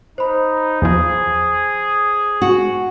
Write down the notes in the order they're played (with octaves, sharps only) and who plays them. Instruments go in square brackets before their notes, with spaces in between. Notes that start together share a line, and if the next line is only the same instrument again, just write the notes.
[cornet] D#4 [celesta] C5 B5
[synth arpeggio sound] E2 F3 [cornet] G#4
[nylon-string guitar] F#4